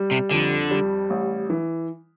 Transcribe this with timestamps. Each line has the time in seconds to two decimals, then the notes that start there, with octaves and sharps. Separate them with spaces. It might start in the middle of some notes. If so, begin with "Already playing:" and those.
Already playing: G3
0.11 C3
0.31 F2 D3
0.71 G3
1.10 A1
1.50 E3